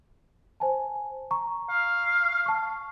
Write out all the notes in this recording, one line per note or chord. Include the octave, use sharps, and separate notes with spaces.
C5 G#5 A5
A#5 C#6
F5
A5 C#6